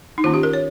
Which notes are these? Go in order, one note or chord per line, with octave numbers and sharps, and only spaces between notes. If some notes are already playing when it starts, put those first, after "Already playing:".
D#4
D#3 A#3 C#4 F4
G4
A#4
C#5